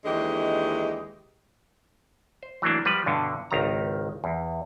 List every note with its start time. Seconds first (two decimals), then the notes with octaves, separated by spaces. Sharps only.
0.05 D#2 D3 E3 G#3 G4 D#5
2.43 C5
2.62 E3 F#3 A3 A#3 D4
2.85 F3 G3 B4
3.06 G2 B2 D3
3.51 G#1 C#2 D#3 A#5
4.24 E2